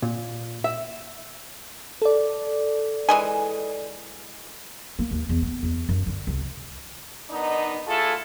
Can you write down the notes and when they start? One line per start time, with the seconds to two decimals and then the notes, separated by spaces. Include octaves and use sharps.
0.02 A#2
0.64 E5
2.02 A4 D5
3.09 E3 G#3 G#5
4.99 A#3
5.11 D#2
5.29 E2
5.42 B3
5.63 E2
5.89 F#2
6.07 D3
6.27 C2
7.30 D#3 B3 D4 D#4
7.87 A3 E4 F4 G#4 A4